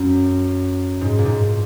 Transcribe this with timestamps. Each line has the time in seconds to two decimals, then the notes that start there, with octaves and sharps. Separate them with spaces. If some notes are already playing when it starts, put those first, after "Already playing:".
Already playing: F#2
1.01 G#2
1.18 A#2
1.26 G#2